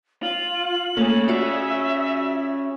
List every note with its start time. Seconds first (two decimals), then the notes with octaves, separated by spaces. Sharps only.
0.23 F4 F#7
0.97 A3 A#3 C#4 G#4 A4
1.28 F4 F#4 D5 E5